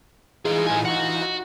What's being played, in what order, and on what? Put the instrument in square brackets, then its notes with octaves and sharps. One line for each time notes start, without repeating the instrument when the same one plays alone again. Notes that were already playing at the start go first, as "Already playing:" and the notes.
[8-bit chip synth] E3 D#4 F4 [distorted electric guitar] G#4 C5
[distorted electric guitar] A2 G#5
F#4 F#5